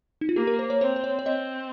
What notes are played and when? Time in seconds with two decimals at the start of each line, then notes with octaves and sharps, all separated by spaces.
0.21 D#4
0.29 F4
0.36 A#3 G4
0.47 A#4
0.59 C5
0.70 C#5
0.81 C4 C5
0.96 C5
1.04 C#5
1.19 C#5
1.26 C4 D#5